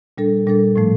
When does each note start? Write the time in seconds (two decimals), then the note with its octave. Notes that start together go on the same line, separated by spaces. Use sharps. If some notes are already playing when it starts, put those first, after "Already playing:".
0.18 A#2 G3 D4 A4
0.47 A#2 G3 D4 A4
0.76 A2 F3 A3